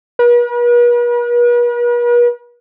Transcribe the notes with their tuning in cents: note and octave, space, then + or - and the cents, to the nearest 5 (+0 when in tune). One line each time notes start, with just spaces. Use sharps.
B4 -45